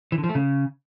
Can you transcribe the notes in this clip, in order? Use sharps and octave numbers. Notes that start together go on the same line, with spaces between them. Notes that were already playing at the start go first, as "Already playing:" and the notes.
E3
D3
F3
A3
C#3